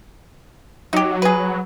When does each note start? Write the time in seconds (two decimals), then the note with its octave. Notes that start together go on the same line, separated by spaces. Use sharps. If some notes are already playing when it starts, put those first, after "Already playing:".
0.93 F#3 D#4 G4
1.22 G#4 B4